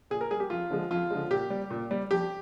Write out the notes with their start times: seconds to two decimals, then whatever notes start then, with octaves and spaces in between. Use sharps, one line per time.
0.10 A#2 G#4
0.21 A#4
0.31 G3 G#4
0.40 G4
0.50 F2 F4
0.70 D3 F3 G#3
0.91 F2 F4
1.10 D3 F3 G#3
1.30 A#2 G4
1.50 G3
1.70 A#2
1.91 G3
2.11 F2 G4